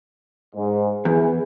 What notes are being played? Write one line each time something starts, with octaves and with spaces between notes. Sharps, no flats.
G#2
E2 E3 G#4